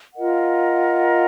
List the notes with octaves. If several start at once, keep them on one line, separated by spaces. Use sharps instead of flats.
F4 A#4 D#5 F#5